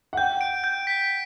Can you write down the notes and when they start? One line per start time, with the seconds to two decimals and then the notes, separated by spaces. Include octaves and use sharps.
0.13 F#5
0.17 G5 G6
0.41 D7
0.64 G6
0.87 B6